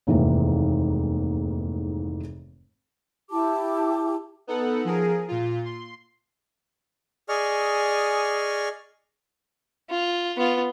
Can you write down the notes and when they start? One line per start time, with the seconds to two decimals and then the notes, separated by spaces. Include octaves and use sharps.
0.07 F1 D#2 G#2 E3 E5
3.30 E4 G4 A5 D6
4.47 B3 D#4 A4 F#5
4.85 F3 G#4 A#4
5.28 A#2 F4
5.65 C6
7.29 G#4 D5 D#5 G#5 C#6 F6
9.90 F4
10.37 B3 F4